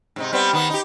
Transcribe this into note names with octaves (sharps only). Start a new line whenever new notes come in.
G#2 C3 D#4
G3 B3 C4
D#3 B3 D#4
D#4 G4